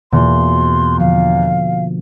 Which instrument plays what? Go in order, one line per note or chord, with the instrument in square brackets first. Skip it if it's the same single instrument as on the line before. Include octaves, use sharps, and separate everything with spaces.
[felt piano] E2 [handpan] B2 A#3 F4 [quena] C6
[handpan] D3 F3 [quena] F5